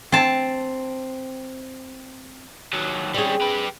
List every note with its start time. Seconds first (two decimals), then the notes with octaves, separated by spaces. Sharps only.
0.12 C4 A5
2.73 D#2 F#3
3.14 G3 C4 C#4 G#4
3.41 G4 B4